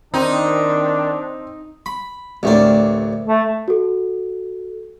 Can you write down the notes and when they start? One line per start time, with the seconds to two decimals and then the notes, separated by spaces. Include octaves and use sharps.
0.14 D#3 C4 D4 D#4
1.86 B5
2.43 A1 D2 A3 A#3 C4 D4
3.28 A3
3.68 F#4 A4